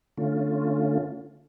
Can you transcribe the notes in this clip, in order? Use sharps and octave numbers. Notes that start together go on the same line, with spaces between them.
D3 A3 C#4 F4